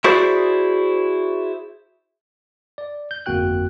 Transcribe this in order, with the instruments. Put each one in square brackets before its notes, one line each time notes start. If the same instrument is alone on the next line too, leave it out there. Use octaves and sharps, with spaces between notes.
[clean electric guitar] E4 F#4 G#4 C5 D5
[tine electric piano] D5
G6
G1 F2 A#3 F#4 G5 F#6